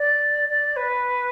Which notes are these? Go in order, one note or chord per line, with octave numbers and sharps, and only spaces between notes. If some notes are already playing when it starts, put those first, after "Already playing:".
Already playing: D5
D5
B4